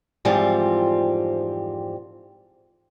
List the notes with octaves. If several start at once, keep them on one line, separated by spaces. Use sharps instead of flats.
F2 G#2 E3 F3 G3 C4